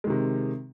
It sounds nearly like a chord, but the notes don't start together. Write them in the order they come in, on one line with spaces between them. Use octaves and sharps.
G#3 D#3 C3